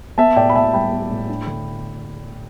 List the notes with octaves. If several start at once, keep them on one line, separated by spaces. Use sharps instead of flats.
B3 E5 A5
A2 D5 G5
B5
A2 E5 A5
G3 G5 B5
B3
A2
D4
D3